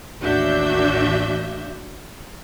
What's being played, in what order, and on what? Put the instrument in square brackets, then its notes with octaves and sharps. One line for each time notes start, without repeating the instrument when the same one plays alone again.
[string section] A1 D#2 D4 F#4 E5 G6